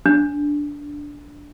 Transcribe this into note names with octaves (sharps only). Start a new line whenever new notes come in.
D4